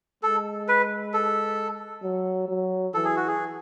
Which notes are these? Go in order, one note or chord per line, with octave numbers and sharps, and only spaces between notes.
G#3 A4
B4
A4
F#3
F#3
E3 A4
G#4
F#4
G#4